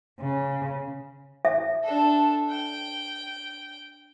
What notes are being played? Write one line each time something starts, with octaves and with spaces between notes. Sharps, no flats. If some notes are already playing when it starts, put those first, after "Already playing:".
C#3
E5
D4 A4
G5